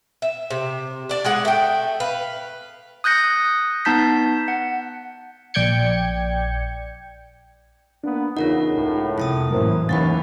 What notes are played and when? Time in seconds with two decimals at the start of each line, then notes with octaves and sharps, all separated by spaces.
0.22 E5
0.50 C3
1.09 D4 D5
1.25 G#3 G#4 F#5
1.45 A3 G5
2.00 B4 F5
3.04 D#6 F#6 G6 A#6 C#7
3.85 B3 D#4 A5 G6 B6
4.48 F#5
5.54 A#1 D5 G5 G6 G#6 C#7
8.04 A#3 B3 D4
8.37 E2 C#3 D#4 F4 A#4 F#5
8.74 C#2 A2
9.18 F2 C3 E4 A5 D#6
9.50 F#2 A2 E3 A#3 A#4 C5
9.89 D#2 E3 C#4 F5 F#5 B5 A6